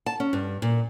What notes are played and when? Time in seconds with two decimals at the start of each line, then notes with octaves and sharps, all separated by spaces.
0.06 A5
0.20 C#4
0.33 G2
0.62 A#2